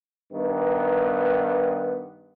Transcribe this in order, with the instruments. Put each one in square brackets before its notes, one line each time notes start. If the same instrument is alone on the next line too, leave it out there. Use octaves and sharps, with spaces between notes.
[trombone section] G2 D#3 B3